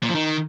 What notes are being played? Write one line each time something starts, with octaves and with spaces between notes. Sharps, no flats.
A#2
F3
D#3